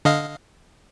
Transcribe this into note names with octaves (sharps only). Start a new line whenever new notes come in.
D3 D#5 F5